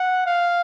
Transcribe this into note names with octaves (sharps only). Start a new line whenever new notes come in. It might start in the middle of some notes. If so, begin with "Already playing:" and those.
Already playing: F#5
F5